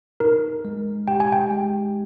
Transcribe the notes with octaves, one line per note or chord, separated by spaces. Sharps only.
D#4 A#4
G#3
G4 G5
G#5
G5
G#3